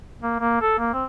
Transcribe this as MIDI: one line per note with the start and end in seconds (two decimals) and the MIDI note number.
0.22 0.35 58
0.40 0.58 58
0.61 0.73 69
0.78 0.93 58
0.94 1.04 60